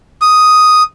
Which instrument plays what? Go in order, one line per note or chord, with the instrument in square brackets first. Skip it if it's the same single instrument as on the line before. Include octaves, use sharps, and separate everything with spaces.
[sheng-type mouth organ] D#6